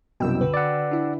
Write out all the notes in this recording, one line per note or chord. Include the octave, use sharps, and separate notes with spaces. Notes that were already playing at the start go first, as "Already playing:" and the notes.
C2 F#2 B2 G5 E6
D3 F#4 B4
D5 F#5
D4 E4